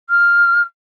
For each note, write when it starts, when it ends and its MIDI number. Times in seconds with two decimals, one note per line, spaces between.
0.10 0.61 89